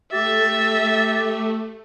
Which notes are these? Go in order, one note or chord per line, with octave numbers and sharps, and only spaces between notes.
A3 G4 E5 A6